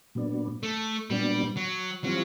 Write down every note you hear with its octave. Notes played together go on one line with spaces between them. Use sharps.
A#2 F#3 B3 D4
A3
A#2 F#3 G3 B3 D4
F#3
E3 F#3 G3 C4 F4